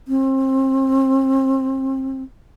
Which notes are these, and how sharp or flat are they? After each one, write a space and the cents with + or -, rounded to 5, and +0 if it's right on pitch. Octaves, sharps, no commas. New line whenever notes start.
C4 +30